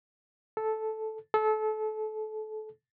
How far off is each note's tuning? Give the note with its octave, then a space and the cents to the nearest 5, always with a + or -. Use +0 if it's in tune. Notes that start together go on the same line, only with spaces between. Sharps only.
A4 -10
A4 -30